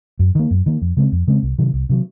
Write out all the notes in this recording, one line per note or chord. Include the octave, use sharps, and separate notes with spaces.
F#2
D#3 A#3
F#2
D#3 A#3
F2
C#3 G#3 C4
F2
C#3 G#3 C4
C2
C3 D#3 F#3
C2
C3 D#3 F#3